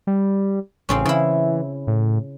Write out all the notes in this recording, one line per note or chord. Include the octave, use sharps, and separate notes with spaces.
G3
A1 C#3 C4 C#4
C#3 E3 E4
A2